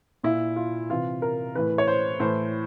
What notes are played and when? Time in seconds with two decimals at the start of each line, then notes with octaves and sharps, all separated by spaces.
0.23 A#2 E4
0.56 F4
0.89 C3 E3 F4
1.22 A#4
1.55 A2 E3 B4
1.78 C#5
1.87 C5
2.20 A2 E3 C5